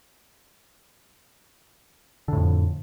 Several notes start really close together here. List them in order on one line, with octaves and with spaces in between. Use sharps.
D3 A2 F2